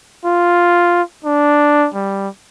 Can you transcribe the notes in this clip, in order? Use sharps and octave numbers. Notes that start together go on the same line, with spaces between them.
F4
D4
G3